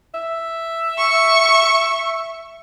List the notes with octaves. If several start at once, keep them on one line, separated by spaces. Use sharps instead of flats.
E5
C#6